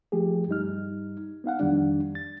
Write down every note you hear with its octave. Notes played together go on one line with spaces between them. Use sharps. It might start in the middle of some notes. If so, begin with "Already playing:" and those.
F3 A3 G4 G#4
G2 G3 D#4 F6
B3 D#4 F5 F#5
F2 D#3 G3 D4
A6